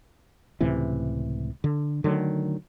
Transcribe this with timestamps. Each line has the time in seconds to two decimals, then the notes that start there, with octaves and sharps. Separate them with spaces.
0.60 C#2 A2 C3 E3
1.64 D3
2.04 D3 D#3 F#3 A3